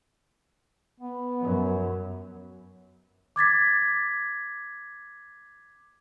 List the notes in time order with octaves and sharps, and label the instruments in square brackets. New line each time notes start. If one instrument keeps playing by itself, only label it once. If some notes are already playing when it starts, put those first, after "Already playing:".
[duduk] B3
[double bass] F#2
[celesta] D6 G#6 A6 B6